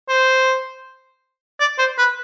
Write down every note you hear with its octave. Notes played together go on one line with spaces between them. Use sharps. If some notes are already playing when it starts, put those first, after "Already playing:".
C5
D5
C5
B4